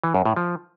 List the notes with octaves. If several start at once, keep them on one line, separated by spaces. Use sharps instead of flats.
E3
F#2
A2
F3